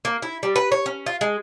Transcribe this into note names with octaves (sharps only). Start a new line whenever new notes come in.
A#3
E4
G3
B4
C#5
C#4
F4
G#3